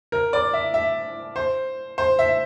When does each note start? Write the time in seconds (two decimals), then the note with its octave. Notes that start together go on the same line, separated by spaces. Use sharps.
0.12 A#4
0.33 D5
0.53 E5
0.74 E5
1.36 C5
1.98 C5
2.19 E5